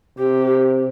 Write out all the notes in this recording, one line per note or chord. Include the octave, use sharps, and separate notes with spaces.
C3 G4